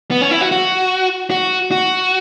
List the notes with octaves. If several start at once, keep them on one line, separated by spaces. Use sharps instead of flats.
B3
C#4
E4
F#4
F#4
F#4
F#4